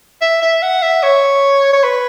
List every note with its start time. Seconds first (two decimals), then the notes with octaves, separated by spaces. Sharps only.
0.22 E5
0.42 E5
0.62 F#5
0.82 E5
1.03 C#5
1.73 C#5
1.83 B4